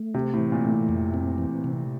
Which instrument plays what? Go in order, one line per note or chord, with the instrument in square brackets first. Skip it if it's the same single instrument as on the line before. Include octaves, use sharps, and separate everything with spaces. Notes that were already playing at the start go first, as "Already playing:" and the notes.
Already playing: [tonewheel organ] A3
[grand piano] C3 [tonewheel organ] C4
[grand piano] A2
[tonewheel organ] E3
[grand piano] A#2
[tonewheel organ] A3
[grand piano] A2
[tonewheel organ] F2
C4
E3
C3